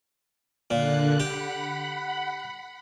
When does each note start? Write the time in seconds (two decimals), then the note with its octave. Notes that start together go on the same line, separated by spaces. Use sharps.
0.70 A#2 D3 F#6
1.20 G4 F#5 B5